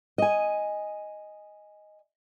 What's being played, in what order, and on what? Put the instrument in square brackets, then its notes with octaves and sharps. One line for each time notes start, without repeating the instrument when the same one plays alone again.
[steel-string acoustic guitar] D#5 G#5